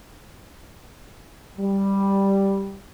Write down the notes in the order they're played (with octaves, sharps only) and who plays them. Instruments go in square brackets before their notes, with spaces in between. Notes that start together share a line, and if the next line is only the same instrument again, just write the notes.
[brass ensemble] G3